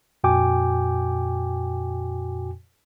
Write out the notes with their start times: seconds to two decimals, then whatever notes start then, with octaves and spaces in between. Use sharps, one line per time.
0.24 F2 A#2 F#4 G5 G#5 D6